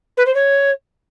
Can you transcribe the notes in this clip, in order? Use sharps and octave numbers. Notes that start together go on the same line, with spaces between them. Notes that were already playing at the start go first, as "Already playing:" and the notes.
B4
C5
C#5